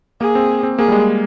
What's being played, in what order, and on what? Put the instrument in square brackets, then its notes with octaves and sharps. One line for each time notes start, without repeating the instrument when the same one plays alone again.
[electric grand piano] A#3 [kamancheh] G#4
[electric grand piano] C4
C4
[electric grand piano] A#3 [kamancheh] G#4
[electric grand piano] G3
G#3